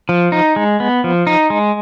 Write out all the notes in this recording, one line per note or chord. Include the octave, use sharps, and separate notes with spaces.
F3
D#4
G#3
B3
F3
D#4
G#3